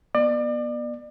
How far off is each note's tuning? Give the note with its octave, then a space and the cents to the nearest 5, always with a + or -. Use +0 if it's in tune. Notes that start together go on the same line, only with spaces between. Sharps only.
B3 -35 D5 +35